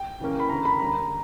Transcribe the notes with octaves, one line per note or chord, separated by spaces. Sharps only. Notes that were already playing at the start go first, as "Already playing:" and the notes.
Already playing: G5
C#3 E3 A#3 C#4
B5
D3 A#3 C#4 A#5
B5
D3 G3 A#3 A#5